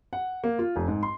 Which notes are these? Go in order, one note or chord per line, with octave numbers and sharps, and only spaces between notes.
F#5
A#3
F4
F1
G#2
C6